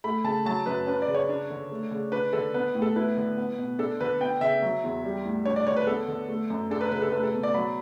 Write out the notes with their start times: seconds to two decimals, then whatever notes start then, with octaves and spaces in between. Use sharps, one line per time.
0.04 A3 B5
0.24 C#3 A5
0.45 F#3 A5
0.66 F#2 B4
0.87 C#4 B4
1.02 D5
1.08 C#3
1.15 C#5
1.29 D4
1.50 D3
1.71 A3
1.91 C#3
2.12 D4 B4
2.33 D3 A4
2.54 B3 B4
2.75 A2
2.82 A4
2.96 E4 B4
3.17 D3
3.37 B3
3.58 B2
3.79 D4 A4
4.01 D3 B4
4.21 B3 G5
4.41 C#3 E5
4.62 F#3
4.83 E2
5.04 G3
5.25 A2
5.45 D4 C#5
5.56 D5
5.67 D3 C#5
5.76 B4
5.87 B3 A4
6.08 D3
6.29 A3
6.50 F#2
6.71 D4 A4
6.81 B4
6.91 C#3 B4
7.02 A4
7.12 A3 B4
7.23 A4
7.34 B2
7.43 D5
7.54 F#3 B5